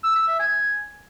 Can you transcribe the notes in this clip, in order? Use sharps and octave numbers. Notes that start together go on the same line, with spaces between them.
E6
E6
E5
G#5